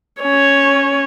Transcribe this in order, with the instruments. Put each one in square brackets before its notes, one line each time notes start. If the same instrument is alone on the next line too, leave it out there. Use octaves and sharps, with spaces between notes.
[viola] C#4 C#5